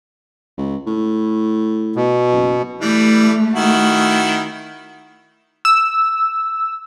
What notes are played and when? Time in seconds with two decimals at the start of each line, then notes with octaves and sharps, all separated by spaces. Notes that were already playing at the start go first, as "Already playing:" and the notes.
0.58 C#2
0.87 A2
1.96 B2
2.32 F#1
2.81 E3 G3 A3
3.55 D#3 E4 F#4
5.65 E6